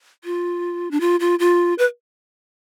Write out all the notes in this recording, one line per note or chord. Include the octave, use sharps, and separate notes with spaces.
F4
D4
F4
F4
F4
B4